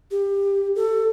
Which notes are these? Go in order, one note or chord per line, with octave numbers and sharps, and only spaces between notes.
G4
A4